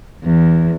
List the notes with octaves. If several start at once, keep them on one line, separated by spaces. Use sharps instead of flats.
E2